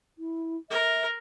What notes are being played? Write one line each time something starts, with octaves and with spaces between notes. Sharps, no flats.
E4
A#4 E5